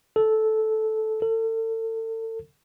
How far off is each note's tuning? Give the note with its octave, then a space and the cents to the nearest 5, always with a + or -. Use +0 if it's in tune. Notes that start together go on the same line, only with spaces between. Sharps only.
A4 -10
A4 +35